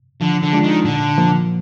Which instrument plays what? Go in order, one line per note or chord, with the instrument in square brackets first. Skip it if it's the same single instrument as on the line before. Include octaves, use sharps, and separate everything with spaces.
[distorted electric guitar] D3 [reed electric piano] F3
[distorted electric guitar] D3
[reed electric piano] G#3 D4 F4
[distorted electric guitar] D#3
[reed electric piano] A#2 [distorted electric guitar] D3
[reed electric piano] F3 A#3